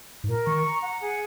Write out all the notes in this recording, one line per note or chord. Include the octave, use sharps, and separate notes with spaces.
G#2
A#2 A#4
D#3 C#6
A#5
F#5
G#4